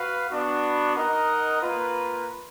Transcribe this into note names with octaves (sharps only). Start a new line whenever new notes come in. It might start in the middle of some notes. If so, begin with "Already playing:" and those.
Already playing: F#4 B4 F5
B3 D4 F#4
D#4 A#4 D#5 F#5
A#3 F4 B4